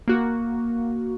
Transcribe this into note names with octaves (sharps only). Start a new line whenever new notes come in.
A#3 F#4